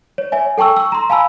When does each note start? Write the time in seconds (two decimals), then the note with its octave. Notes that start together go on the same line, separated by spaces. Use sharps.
0.18 C#5
0.32 C#5 E5 G#5
0.58 A4 G5 A5 C#6 E6
0.77 C#6 E6
0.92 A#5 C6
1.10 F5 G#5 A5 B5 E6